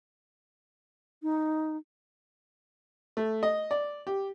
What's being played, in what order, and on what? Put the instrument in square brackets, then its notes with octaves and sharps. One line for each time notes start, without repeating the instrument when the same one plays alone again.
[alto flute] D#4
[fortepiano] A3
D#5
D5
G4